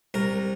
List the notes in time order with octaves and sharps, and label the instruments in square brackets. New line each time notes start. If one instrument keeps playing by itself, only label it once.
[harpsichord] C2 A#4